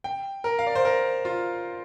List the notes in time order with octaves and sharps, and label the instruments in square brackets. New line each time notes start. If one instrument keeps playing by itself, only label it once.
[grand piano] G5
A#4
F5
D5
C5
A#4
F4